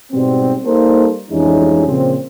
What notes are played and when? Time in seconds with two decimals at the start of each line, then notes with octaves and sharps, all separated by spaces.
0.12 G#2 B2 G3 B3 C4
0.65 G3 A#3 D#4 A4 A#4 C5
1.30 F2 E3 G3 G#3 C#4 D#4
1.87 A#2 C#3 F3 C4